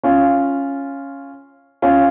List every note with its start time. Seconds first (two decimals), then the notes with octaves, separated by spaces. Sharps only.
0.03 C#4 F4
1.82 C#4 F4